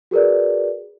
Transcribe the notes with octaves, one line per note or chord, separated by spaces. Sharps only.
F#4 G#4 A#4 B4 D5